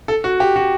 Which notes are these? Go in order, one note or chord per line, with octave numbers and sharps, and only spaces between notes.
A4
F#4
G4
F#4